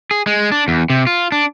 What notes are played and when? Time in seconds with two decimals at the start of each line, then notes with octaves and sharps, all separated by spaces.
0.11 G#4
0.27 G#3
0.52 D4
0.68 E2
0.90 C3
1.07 F4
1.32 D4